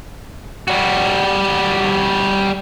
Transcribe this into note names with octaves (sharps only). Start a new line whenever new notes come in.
G3 F#4